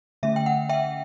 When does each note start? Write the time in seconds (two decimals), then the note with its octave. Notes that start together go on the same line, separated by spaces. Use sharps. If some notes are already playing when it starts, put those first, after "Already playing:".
0.23 D3 A3 C#4 E5
0.36 G5
0.46 F#5
0.69 E5 G5